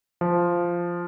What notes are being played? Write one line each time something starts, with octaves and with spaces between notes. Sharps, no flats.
F3